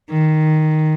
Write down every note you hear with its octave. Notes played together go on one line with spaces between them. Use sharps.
D#3